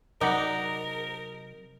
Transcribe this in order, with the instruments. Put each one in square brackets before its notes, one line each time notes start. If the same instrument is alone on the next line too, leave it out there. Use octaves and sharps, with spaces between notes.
[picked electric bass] C3 F#3 [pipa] D#4 [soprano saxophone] A#4 [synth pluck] D5 F#5 A#5